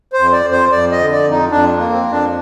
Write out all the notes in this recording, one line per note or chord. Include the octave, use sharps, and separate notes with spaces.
C5
F2
D5
F2
C5
F2 D5
D#5
D3
D5
F2
D#4
F2 D4
A#3
C4
F2
D4